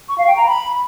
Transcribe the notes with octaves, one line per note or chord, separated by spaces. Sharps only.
C#6
F5
G5
A#5
B5